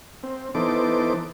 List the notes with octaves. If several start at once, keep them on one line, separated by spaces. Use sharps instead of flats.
C4
E3 B3 D#4 A4 C5 D6